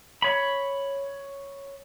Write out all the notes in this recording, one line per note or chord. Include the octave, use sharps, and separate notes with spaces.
C#5 B5